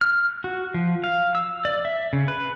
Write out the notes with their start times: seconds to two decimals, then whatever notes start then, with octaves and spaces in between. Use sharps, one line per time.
0.01 F6
0.44 F#4
0.74 F3
1.04 F5
1.35 E6
1.65 D5
1.85 E5
2.13 C#3
2.28 B4